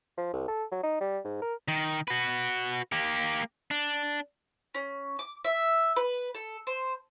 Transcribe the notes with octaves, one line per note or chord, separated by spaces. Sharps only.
F3
C2
A4
F#3
D#4
G3
G#2
A#4
D#3
F#4 B4
A#3 G4
D4
C#4
D6
E5
B4
A4
C5